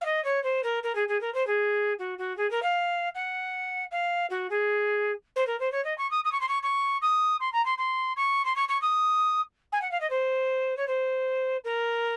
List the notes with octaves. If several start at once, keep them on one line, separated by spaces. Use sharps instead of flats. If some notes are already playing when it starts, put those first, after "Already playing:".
F5
D#5
C#5
C5
A#4
A#4
G#4
G#4
A#4
C5
G#4
F#4
F#4
G#4
A#4
F5
F#5
F5
F#4
G#4
C5
A#4
C5
C#5
D#5
C#6
D#6
D#6
C#6
C6
C#6
C#6
D#6
C6
A#5
C6
C6
C#6
C6
C#6
C#6
D#6
G#5
F#5
F5
D#5
C5
C#5
C5
A#4